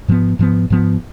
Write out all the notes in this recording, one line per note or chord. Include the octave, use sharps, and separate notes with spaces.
G#2 F3 B3
G#2 F3 B3
G#2 F3 B3